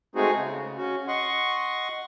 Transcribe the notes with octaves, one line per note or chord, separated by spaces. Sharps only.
G#3 A3 C4 D#4 F#4 G#4
C#3
C#4 F#4
D#5 F#5 C6 C#6